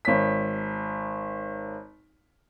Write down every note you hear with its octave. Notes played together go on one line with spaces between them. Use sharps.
G#1 C#5 B6